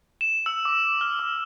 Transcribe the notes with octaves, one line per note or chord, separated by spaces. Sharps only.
E7
E6
D6
F6
D6